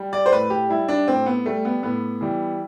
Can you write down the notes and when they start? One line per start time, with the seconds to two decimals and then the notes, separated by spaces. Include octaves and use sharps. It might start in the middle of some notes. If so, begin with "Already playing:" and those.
Already playing: G3
0.13 D5
0.26 C5
0.32 A2 B4
0.50 G4
0.69 G3 E4
0.88 D4
1.07 A2 C4
1.26 B3
1.46 G3 A3
1.65 B3
1.83 A2 B3
2.21 E3 G3